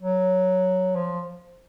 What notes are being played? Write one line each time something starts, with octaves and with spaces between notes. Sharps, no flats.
F#3
F3